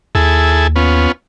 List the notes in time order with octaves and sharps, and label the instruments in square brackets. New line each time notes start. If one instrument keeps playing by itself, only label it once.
[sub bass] D#2 [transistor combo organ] E4 G#4 A4
[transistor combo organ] B3 C#4 F4